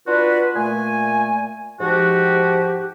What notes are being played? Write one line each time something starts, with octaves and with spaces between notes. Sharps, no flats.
D4 F4 F#4 B4
A#2 A3 G#5
G#2 F3 F#4 G4